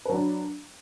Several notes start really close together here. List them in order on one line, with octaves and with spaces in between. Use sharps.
B4 F#3 D4